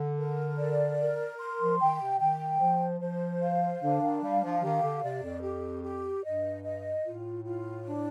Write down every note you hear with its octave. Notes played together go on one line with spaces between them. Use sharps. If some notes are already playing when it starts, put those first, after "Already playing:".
Already playing: D3
A#4
D5
A#4
C6
F3
D#3 G5
C3
D#3 G5
F3 C5
F3 C5
F5
D3 D4
D#3
G3 F5
F3
D#3 G4
D3
C3 D5
F2
G4
G4
G2 D#5
D#5
A2 F4
F4
D4